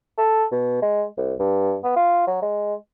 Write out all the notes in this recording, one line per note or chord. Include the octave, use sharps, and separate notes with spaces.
A4
B2
G#3
C2
G2
B3
F4
F#3
G#3